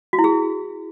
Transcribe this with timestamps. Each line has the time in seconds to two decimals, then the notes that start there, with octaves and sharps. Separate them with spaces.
0.13 F#4
0.19 E4
0.24 G#4